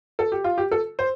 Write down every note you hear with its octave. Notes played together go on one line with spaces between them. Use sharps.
A4
G4
F4
G4
A4
C5